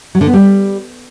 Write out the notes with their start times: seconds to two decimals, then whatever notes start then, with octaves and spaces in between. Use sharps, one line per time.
0.15 F#3
0.21 D3
0.27 B3
0.33 G3